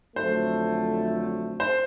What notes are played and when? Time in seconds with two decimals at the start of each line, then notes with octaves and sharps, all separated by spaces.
0.16 F2 D3 F#3 A3 C5
1.60 C5